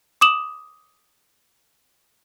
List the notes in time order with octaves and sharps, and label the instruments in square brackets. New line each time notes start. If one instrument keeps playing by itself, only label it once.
[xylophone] D6 D#6 E7 F#7